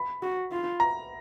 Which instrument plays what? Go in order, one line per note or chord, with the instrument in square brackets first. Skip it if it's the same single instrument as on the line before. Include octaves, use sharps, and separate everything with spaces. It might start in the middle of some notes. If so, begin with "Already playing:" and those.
Already playing: [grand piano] B5
[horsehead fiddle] F#4
F4
[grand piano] A#5